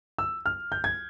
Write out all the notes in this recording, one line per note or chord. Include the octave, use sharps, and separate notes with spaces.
E6
F6
G6
G#6